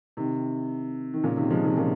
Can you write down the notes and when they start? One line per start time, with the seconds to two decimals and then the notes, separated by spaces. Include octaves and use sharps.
0.17 C3 D#3
1.14 D#3
1.23 A#2 C#3
1.37 C3 D#3
1.50 F3 G#3
1.64 C3 D#3
1.77 A#2 C#3